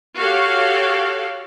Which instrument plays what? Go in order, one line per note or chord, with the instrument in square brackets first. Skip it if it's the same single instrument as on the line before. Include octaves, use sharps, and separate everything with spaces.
[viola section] F#4 G4 A4 C#5 F5